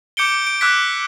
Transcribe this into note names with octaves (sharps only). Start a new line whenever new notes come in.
D6 G6 C#7 D7 G7
D7
D6 E6 F#6 G#6 B6